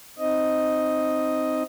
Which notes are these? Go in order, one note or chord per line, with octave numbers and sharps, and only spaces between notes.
C4 D#4 D#5